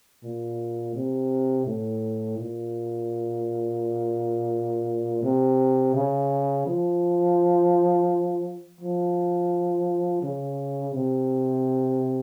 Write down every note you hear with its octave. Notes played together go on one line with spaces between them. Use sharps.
A#2
C3
A2
A#2
C3
C#3
F3
F3
C#3
C3